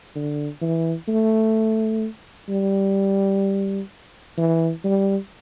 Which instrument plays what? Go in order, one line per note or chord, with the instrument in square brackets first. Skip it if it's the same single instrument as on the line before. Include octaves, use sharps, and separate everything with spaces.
[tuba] D3
E3
A3
G3
E3
G3